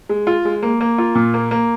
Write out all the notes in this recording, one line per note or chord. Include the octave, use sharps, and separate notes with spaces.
G#3
F4
G#3
A#3
A#3
F4
A#2
A#3
A#3